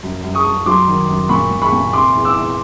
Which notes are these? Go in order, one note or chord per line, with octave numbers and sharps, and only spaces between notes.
F#2
F#2
C#6 D#6
F#2
F#3 C6 D6
D#3
F#2
A#2 B5 C#6
A#2
B5 C#6
A#2
C3 C6 D6
E2
D6 E6
E2